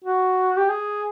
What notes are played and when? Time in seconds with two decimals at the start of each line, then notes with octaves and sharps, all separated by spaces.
0.05 F#4
0.57 G4
0.69 G#4